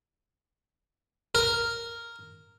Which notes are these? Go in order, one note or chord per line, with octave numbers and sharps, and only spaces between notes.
A#4